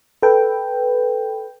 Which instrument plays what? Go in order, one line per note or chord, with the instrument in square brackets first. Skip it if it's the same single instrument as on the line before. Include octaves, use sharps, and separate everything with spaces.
[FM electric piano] A4 B4 G5